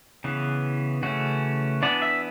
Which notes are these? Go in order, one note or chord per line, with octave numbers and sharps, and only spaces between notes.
C#3 E3 B3
C#3 E3 A3 C#4 F#4
E3 B3 D4 D5
E5